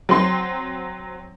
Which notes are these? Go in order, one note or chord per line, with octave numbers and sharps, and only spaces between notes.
F#3 C4 C6